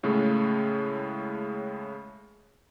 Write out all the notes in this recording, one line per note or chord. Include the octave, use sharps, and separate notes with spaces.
A2 C#3 G#3 A3